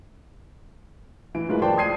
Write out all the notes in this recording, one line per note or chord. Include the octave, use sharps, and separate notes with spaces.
E3 D7
F#3 G#3 F4 A#4 B4
C5 D5 G5 A5 C6
D#6 G#6 C7 D#7